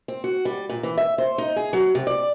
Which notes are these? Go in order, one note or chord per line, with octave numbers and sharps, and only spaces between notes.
C4
F#4
G3
A#2
E3
E5
C5
D#4
G#4
F#3
C3
D5